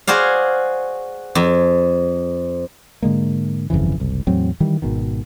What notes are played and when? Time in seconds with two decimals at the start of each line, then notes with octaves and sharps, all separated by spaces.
0.07 F#4 G#4 C5 D5 F5
1.35 F2
3.02 G#2 D3 G#3 A#3
3.70 G1 F2 C#3 E3
3.96 F#1 C2
4.27 E2 A2 F#3 C4
4.60 D#3 E3 G3
4.82 G#1 B2 D#3